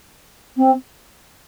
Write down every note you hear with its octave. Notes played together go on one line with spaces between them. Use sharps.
C4